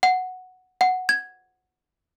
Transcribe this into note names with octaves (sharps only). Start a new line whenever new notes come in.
F#5
F#5
G#6